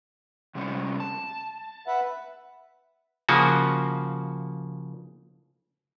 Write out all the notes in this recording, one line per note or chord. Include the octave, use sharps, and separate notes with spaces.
C3 G3 C#4
A5
B4 E5 F#5
C#3 F3 A#3 F#4